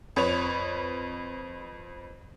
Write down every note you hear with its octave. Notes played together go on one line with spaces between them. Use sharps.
F2 B4 C#5 F7